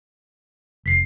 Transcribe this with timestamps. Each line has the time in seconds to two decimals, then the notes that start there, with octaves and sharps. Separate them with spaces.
0.86 F1 B6 C7